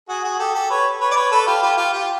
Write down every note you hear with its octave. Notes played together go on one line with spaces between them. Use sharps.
F#4 G#4
F#4 G#4
G4 A4
G4 A4
B4 C#5
B4 C#5
D5
B4 C#5
A4 B4
F4 G4
F4 G4
F4 G4
F4 G4